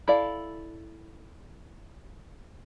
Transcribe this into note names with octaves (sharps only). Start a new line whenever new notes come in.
E4 A4 D5 F5